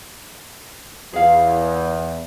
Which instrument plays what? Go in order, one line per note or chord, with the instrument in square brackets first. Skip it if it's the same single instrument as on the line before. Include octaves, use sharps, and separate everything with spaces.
[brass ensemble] E2 [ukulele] G#4 F5